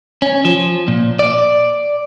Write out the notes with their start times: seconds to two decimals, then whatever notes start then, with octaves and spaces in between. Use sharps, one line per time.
0.22 C#4
0.45 F3
0.88 A#2
1.19 D5